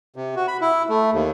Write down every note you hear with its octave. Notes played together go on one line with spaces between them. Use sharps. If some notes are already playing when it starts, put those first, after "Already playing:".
C3
F#4
B5
E4
A3
D#2